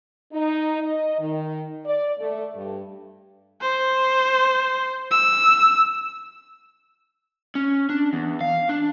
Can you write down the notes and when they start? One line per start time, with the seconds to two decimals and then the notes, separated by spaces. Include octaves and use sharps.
0.33 D#4
0.82 D#5
1.19 D#3
1.86 D5
2.20 A3
2.56 G2
3.61 C5
5.11 E6
7.55 C#4
7.89 D4
8.13 E2
8.41 F5
8.69 D4